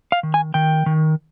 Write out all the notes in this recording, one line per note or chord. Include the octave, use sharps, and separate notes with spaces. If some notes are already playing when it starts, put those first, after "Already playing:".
F5
D#3
G#5
D#3 G5
D#3